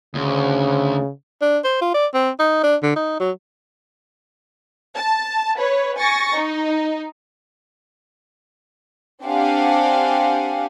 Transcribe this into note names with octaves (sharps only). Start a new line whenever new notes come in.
D2 C#3
D4
C5
F4
D5
C4
D#4
D4
D3
D#4
F#3
A5
B4 C#5
G#5 C#6 A6 A#6
D#4
C4 D4 G4 F5 F#5 G#5